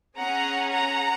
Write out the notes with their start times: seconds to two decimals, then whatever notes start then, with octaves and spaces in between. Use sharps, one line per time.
0.17 C#4 G#4 F#5 A#5
0.72 F#5 A#5